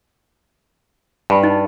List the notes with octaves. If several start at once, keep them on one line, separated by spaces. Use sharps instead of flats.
G2 G#5 B5
D#4